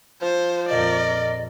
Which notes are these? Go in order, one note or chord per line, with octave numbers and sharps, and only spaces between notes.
F3 C5
A#1 F2 A#4 D5 D#5